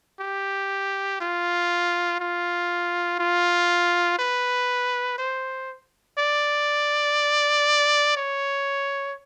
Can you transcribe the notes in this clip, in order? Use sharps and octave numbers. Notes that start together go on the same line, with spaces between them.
G4
F4
F4
F4
B4
C5
D5
C#5